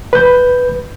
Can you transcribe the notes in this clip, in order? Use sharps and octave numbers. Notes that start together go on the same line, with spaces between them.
B4 G6